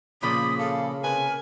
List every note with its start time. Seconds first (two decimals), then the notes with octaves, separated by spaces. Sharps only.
0.23 A#2 C#3 F3 A#3 B5 D#6
0.59 A4 F5
1.04 C3 A#4 B4 G#5